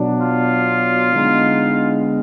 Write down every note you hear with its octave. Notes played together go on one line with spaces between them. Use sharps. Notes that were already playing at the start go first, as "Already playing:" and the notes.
Already playing: B2 F#3 D4
F4
D3 G#3 B3 D#4